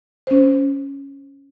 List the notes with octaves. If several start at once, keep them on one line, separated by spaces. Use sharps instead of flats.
C#4 C5